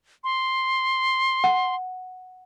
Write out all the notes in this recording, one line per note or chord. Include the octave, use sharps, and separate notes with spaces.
C6
F#5